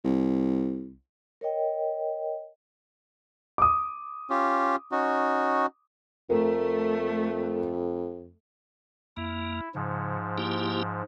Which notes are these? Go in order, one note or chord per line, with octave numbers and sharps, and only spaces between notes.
C2
A#4 C#5 D#5 G5
D6 D#6
C#4 F4 G4
C#4 D#4 F#4
F2 A3 A#4
F2 A#3 E4
G#2 C#3 F3
A#3 E4 G4